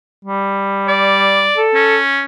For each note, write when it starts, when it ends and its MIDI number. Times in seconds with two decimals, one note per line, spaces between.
0.25 1.51 55
0.88 1.65 74
1.58 1.99 69
1.74 2.25 61